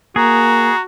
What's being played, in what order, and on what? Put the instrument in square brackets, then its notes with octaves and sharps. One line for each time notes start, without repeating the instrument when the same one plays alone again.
[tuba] A#3 [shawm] F#4 [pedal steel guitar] G#4 [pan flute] A#5